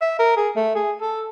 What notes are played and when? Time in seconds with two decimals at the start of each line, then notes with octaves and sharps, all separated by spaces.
0.01 E5
0.19 A#4
0.37 G#4
0.56 A3
0.75 G#4
1.01 A4